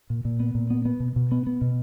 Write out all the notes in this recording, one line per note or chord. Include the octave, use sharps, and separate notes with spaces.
A#2
A#2
B3
A#2
B3
B3
B2
B2
B3
B3
B2